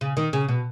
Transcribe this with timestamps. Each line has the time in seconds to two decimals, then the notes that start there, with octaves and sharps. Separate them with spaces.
0.01 C#3
0.17 D#3
0.33 C#3
0.48 B2